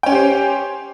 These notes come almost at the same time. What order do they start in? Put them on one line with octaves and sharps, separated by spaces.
G5 C#4 C#5 G4 C5